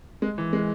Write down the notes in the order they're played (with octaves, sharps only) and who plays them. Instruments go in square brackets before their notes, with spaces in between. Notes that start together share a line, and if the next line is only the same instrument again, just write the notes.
[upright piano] G#3
E3
G#3